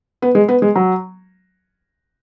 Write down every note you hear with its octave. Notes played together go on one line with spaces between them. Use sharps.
B3
G#3
B3
G#3
F#3